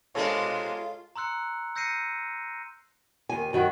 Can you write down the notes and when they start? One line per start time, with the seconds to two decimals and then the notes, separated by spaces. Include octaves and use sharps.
0.15 B2 G#3 A#3 D4 F4 A4 C#5
1.16 A#5 C6 E6 F#6 C#7
1.75 E6 G6 A#6 C7 C#7 D#7
3.29 D#2 G#5
3.53 F#2 D#3 G3 F#4